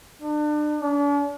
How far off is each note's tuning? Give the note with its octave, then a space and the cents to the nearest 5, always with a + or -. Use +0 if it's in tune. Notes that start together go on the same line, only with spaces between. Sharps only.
D4 +35
D4 -45